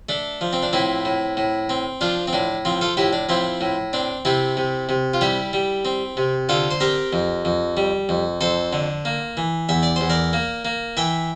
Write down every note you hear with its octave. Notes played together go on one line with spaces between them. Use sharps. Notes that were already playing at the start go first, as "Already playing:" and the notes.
A3 D4
F3
C4
D4
A2 C4 E4
A2
A2
C4
F3 D4 F4
C4
A2 D4
F3 C4
F4 A4
A2 E4 G4
D4
F3 C4 E4
A2
C4 D4
C3 C4 E4
C3
C3
F4
G3 E4 G4
G3
C4
C3
D3 F4 A4
C5
C4 G4 A#4
F2
F2
G3
F2
F2 A4 C5
D3
A#3
E3
E2 E5
D5
E2 C5
A#4 D5
A#3
A#3
E3 E5 G5